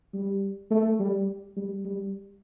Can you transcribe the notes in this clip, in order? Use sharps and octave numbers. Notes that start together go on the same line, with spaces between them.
G3
A3
G3
G3
G3